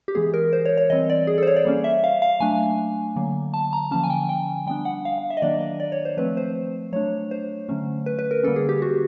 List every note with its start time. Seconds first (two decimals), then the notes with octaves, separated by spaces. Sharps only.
0.08 G4
0.15 E3 G#3 B3 G#4
0.34 A#4
0.53 C5
0.66 C#5
0.77 C#5
0.90 E3 G3 C4 D#5
1.10 D5
1.27 G#4
1.38 A4
1.43 C5
1.47 C#5
1.56 D5
1.65 G3 A#3 C#4
1.84 E5
2.04 F5
2.22 F5
2.40 F#3 A3 D4 G#5
3.16 D3 F#3 A#3
3.54 A5
3.73 A#5
3.91 D3 F3 A#3 C#4 A5
4.04 G#5
4.10 G5
4.29 G5
4.67 G3 B3 D4 G5
4.85 F#5
5.05 F5
5.18 F5
5.30 E5
5.37 D#5
5.42 D#3 F#3 A#3 D4 D5
5.61 D#5
5.80 D5
5.92 C#5
6.05 C5
6.17 F3 A3 C4 B4
6.37 C5
6.93 F#3 A3 D4 C#5
7.31 C5
7.69 D3 F#3 A3 C#4
8.06 B4
8.19 B4
8.31 A#4
8.43 D3 G3 A#3 C#4 A4
8.56 G#4
8.69 G4
8.82 F#4